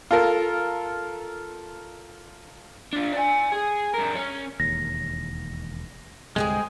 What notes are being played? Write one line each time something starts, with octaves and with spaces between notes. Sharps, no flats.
F4 A4 A#4
D4 F4
D5 G#5
G#4
G2 A#4
C#4
E1 D#2 A#6
C2 G2 D3 G#3 G#4 C5 G5